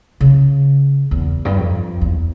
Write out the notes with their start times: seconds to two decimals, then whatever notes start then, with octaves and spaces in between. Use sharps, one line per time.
0.21 C#3
1.11 E2
1.45 G2
1.56 F2
2.01 E2